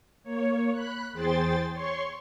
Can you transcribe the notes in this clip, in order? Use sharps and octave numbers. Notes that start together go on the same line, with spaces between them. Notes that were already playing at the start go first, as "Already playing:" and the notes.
A#3 C#5
B5 F#6
E2 G#4 C5 G5 C6 A6
C#5 C6 C#6